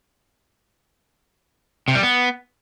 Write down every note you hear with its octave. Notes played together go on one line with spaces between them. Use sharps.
C3
G3
B3